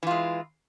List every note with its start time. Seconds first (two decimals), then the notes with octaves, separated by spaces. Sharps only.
0.03 E3
0.07 F4
0.11 G#3